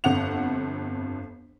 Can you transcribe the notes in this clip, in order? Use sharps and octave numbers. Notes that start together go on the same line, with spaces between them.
G1 F2 F#5 F7